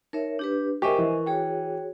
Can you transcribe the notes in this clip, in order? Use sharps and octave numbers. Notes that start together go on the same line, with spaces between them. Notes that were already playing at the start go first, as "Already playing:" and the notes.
D#4 A#4 C#5 E5
D4 G4 B4 G6
G4 A#4 C5 D#5 E5 G#5 C#6
E3
F#4 G#4 C#5 G5